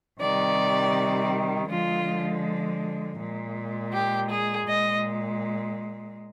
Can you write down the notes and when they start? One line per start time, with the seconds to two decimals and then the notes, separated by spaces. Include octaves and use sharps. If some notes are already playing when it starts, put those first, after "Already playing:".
0.20 C3 D#3 G3 D5
1.70 D3 F3 G#3 F4
3.19 A#2 G#3
3.94 G4
4.31 G#4
4.68 A#2 G#3 D#5